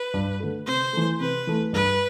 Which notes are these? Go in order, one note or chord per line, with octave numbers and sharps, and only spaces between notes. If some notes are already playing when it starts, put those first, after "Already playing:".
Already playing: B4
G2
D3 A3
C3 C5
E3 A3
C3 B4
E3 A3
G2 B4